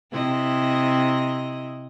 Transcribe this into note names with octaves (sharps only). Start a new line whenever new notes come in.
C3 E4 D#5